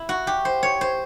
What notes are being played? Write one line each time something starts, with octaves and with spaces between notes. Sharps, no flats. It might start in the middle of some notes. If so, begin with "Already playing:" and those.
Already playing: E4
F#4
G4
C5
C#5
C5